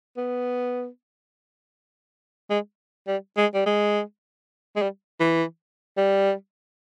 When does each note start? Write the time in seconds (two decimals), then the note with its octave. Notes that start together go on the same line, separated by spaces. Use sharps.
0.17 B3
2.50 G#3
3.07 G3
3.37 G#3
3.54 G3
3.66 G#3
4.76 G#3
4.82 G3
5.20 E3
5.97 G3